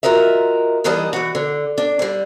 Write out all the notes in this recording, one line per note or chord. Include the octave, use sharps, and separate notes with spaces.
F4 F#4 A#4 D#5 E5
D#2 D#3 E3 G3 D#5 A5
E3 F#4
D3
D4
D3 G3